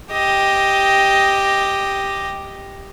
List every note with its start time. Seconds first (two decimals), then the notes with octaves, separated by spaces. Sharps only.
0.12 G4 D#5